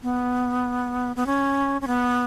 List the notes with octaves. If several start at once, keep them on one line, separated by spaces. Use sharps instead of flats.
B3
B3
C#4
C#4
B3